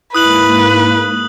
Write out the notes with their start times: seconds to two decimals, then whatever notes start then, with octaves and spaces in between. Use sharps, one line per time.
0.14 G#2 A#3 E4 B4 D#6 F#6 F#7